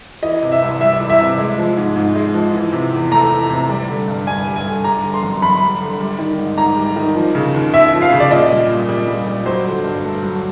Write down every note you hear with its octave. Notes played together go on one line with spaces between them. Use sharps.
E3 D#5
C3
E5
C2
G3 E5
E3
E5
C3
G#3
F3
G#2
G#2
G#3
F3
E3
C3
E2
A3 A#5
E3
C3
G3
D3
G2
G2 G#5
G3
G#5
D3
G3 A#5
D3
C6
F#2
F#2 B5
G3
D3
G3
D#3
G#2
G#2 A#5
G3
D#3
F3
C#3
D#2
D#2 E5
F3
F5
C#3
D5
A#2 D#5
G3
A#2
G3
A#2
G3
F#3 C5
D3
G2
A3
F#3